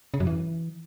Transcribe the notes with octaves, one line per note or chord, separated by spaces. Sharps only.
C#3
F#2
E3